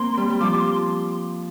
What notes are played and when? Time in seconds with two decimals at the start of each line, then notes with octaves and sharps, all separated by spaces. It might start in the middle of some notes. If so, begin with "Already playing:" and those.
Already playing: A#3 C4 C6
0.17 G3
0.30 G3
0.41 F3 D6
0.52 D6
0.59 C6